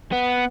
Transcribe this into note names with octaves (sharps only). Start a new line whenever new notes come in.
B3